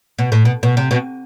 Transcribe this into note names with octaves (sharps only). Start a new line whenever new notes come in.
B2
A2
B2
B2
C3
B2